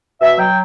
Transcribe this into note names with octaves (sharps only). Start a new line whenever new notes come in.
B2 E5
F#3 G5